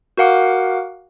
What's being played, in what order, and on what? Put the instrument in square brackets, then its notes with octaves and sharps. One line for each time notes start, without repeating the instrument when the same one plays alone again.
[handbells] F#4 A#4 F5 F#5 D6